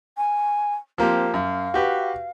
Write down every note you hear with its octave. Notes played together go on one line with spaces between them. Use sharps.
G#5
F3 A#3 C4 G4
F#2 F5
F#4 G4 B4